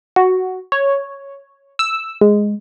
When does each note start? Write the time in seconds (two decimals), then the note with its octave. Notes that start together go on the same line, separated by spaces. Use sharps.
0.16 F#4
0.72 C#5
1.79 E6
2.21 G#3